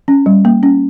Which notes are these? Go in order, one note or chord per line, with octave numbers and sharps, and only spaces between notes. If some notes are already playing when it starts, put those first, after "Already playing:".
C#4
G3
A#3
C#4